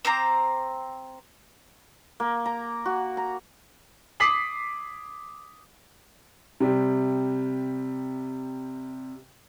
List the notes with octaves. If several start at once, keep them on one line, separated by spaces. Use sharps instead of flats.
C4 C5 A#5 D6
A#3
A#5
F#4
A#5
D6 D#6 B6 C7 F#7
C3 G3